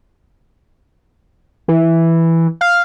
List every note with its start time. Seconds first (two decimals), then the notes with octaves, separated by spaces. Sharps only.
1.68 E3
2.61 F5